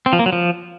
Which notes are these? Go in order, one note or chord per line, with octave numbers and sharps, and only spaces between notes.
C4
F3
A#3
F#3
F3